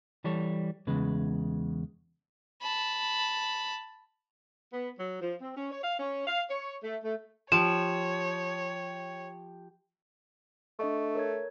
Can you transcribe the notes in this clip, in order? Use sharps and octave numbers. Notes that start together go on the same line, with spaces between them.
E3 G3 A4 C#5
E2 C#3 G#3 B4
A5 B5
B3
F#3
F3
C4
C#4
C#5
F5
C#4
F5
C#5
A3
A3
F3 G4 C#5 E7
A3 D4 D#5 C#6
A#4 C#5 G#6